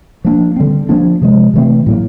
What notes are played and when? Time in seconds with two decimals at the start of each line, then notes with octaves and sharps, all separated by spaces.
0.25 F3 A#3 D4
0.56 D3 G3 C4
0.89 F3 A#3 D4
1.21 C3 F3 G#3
1.54 C3 E3 A3 C4
1.86 A2 F#3 A#3